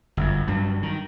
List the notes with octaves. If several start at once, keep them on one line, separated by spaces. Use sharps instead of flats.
G1 F#2
G2 F#3
D#3